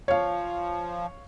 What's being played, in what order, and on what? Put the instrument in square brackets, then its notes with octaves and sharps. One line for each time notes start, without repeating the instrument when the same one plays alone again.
[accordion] F3 [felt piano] C#5 F5